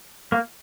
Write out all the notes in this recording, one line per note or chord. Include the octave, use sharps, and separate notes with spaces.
A#3